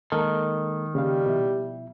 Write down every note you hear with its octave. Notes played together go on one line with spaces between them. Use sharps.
D#3 G#3 A#3 A4 A#4
C#3 G3 A#3 F5
B2 F3 E4 E5